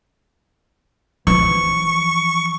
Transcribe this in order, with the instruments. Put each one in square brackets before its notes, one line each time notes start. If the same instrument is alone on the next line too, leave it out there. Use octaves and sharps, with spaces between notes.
[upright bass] E3 F3 [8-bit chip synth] C#6